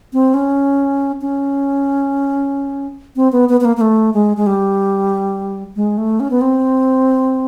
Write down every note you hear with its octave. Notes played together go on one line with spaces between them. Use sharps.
C4
C#4
C#4
C4
B3
B3
B3
A#3
A#3
A3
G#3
G#3
G3
G#3
A3
C#4
B3
C4